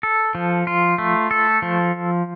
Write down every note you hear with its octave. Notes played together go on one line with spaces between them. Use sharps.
A4
F3
F4
A3
A4
F3